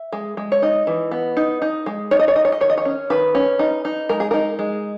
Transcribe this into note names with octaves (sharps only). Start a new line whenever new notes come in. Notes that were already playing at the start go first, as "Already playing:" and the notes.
Already playing: E5
G#3
G#3
C#5
D#4 D#5
E3
B3
D#4
D#4
G#3
D#4 C#5
D#5
C#5
D#4 D#5
C#5
D#5
D#3 C#5
D#5
C#5
C#4
D#3 B4
C#4
D#4
D#4
G#3 A#4
G#4
D#4 A#4
G#3